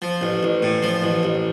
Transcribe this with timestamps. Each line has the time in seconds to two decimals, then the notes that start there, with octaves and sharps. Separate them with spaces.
0.02 F3
0.21 A1
0.43 A1
0.63 A2
0.83 F3
1.02 A1
1.23 A1